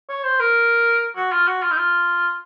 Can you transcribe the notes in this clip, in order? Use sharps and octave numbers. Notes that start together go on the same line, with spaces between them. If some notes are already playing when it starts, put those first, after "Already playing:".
C#5
C5
A#4
F#4
F4
F#4
F4
D#4
F4